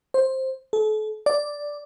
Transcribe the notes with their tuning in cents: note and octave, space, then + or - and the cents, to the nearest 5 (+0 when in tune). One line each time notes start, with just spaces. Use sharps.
C5 +10
A4 -40
D5 +0